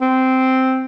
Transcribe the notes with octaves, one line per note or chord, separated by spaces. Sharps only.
C4